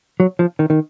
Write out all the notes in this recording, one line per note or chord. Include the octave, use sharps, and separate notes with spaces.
F#3
F3
D#3
D#3